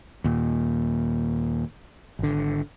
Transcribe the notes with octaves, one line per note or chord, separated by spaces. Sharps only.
D#2 A#2
G#1 D3